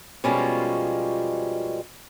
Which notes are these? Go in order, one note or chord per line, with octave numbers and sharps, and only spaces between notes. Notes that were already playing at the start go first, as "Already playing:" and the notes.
B2 F3 G3 G#3 C#4 F4